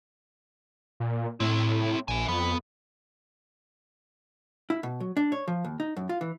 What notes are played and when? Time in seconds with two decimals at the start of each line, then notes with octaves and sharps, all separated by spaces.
1.00 A#2
1.40 A2 C4 E4
2.08 A#1 E5 G#5
2.28 F2 B3
4.70 E4
4.83 B2
5.00 F#3
5.17 D4
5.32 C#5
5.48 F3
5.65 D#2
5.80 D#4
5.97 F#2
6.09 F4
6.21 E3